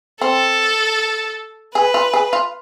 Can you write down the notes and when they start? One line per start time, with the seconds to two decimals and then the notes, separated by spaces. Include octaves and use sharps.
0.21 C4 A4
1.75 G#4 B4
1.94 F4
2.13 G#4
2.33 F4